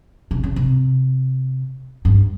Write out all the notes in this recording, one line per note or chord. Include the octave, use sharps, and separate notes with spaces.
C3
C#3
C3
G2